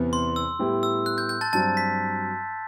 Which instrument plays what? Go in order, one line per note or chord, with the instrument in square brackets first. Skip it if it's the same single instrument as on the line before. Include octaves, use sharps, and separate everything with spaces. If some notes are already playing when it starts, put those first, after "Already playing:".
Already playing: [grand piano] E2 C3 E3 B3
[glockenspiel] C6
E6
[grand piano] A2 G3 B3 E4 G4
[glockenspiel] E6
F#6
G6
G6
A5 A6
[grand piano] G2 F#3 C4 [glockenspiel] A5 A6
[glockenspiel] B6